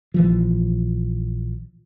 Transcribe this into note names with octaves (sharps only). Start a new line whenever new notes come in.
A#1 E3 F3